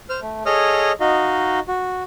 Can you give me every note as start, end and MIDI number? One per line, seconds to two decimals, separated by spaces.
0.10 0.20 72
0.10 0.20 89
0.21 0.43 57
0.46 0.92 68
0.46 0.92 69
0.46 0.92 73
0.46 0.92 75
0.46 0.92 87
0.46 0.92 89
1.00 1.60 63
1.00 1.60 66
1.00 1.60 75
1.00 1.60 77
1.68 2.03 66